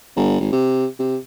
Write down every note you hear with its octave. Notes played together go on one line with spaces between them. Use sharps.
G1
G#1
C3
C3